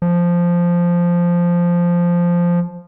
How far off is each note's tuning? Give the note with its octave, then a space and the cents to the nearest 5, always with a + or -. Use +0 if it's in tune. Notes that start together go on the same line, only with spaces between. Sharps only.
F3 -5